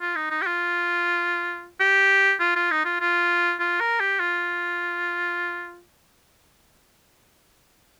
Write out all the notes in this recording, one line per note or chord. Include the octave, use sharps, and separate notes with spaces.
F4
D#4
D#4
G4
F4
G4
F4
F4
D#4
F4
F4
F4
A#4
G4
F4